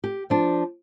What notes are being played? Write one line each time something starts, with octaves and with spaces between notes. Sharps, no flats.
G4
F3 D4